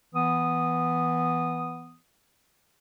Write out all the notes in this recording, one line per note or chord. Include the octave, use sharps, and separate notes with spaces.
E3 B3 D#6